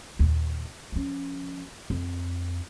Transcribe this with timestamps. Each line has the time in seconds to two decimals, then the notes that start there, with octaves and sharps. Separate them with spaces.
0.19 D#2 A#2
0.92 F3 C#4
1.90 F2